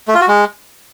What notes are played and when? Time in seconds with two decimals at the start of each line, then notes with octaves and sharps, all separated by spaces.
0.08 A3
0.14 F4
0.21 F#4
0.28 G#3